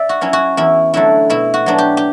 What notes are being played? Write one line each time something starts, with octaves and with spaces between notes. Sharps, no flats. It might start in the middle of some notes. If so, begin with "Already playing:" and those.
Already playing: D5 E5
F#4
F#3 C#4 E4
F#4
E2 E4
D3 F#3 A3 E4
B2 E4
F#4
F#3 B3 D4
G4
G4